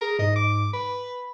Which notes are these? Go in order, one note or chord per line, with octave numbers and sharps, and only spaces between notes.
G#4 A#4
G#2 D#5
D6
B4 B5